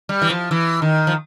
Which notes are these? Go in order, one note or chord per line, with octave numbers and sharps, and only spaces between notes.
G3
E3
F3
E3
D#3
F3